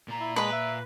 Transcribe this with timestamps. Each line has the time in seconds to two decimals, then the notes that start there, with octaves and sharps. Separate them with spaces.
0.08 A#2 A#5
0.20 E4
0.36 G#3 B4 B5
0.52 E5